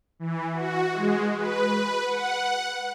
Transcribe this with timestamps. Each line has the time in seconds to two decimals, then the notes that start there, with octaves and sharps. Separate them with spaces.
0.19 E3
0.53 F#4
0.92 G#3
1.37 B4
2.05 F#5